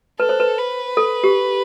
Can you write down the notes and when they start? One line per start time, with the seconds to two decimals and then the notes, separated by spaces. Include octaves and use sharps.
0.20 A4 B4
0.29 C5
0.40 B4
0.58 B4
0.97 A4
1.24 G4